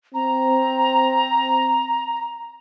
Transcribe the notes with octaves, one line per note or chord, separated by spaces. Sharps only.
C4 A#5